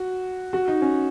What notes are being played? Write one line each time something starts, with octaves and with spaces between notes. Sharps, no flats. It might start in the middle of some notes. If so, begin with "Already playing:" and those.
Already playing: F#4
F#4
D#4
C#4